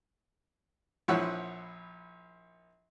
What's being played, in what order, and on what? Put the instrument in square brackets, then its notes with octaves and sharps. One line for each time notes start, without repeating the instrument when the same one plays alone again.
[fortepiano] A#1 F3 E4 C#5 F#5 E6